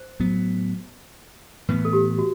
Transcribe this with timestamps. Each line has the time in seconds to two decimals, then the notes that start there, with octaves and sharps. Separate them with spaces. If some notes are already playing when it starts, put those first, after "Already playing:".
Already playing: C5
0.20 A2 F#3 B3
1.68 A2 E3 B3 B4
1.85 A4
1.93 G4
2.18 F#4